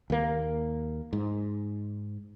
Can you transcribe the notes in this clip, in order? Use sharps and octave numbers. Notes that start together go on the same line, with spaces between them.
D#2 A#3
G#2